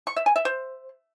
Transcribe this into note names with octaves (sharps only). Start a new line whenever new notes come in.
C#6
E5
G#5
E5
C5